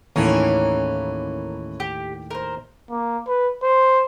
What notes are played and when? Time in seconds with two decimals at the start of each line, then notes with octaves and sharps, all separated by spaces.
0.16 D#2 A2 D#3 E3 A#3 C#4 A#4
1.80 G4
2.31 A#4 C5
2.90 A#3
3.27 B4
3.62 C5